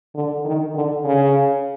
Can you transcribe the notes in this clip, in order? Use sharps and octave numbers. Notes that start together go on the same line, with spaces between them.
D3
D#3
D3
C#3